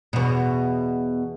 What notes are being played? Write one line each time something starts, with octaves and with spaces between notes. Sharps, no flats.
E2 B2